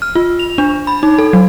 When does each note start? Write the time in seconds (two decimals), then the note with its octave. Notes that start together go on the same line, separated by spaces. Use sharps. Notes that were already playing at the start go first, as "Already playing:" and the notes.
0.02 F6
0.15 F4
0.39 F7
0.58 D4
0.87 B5
1.03 D#4
1.18 A4
1.33 F#3